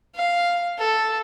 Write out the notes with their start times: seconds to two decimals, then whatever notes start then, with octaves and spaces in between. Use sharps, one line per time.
0.15 F5
0.78 A4